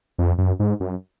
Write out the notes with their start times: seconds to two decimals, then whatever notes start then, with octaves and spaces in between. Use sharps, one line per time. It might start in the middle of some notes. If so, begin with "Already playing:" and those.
0.18 F2
0.38 F#2
0.59 G#2
0.80 F#2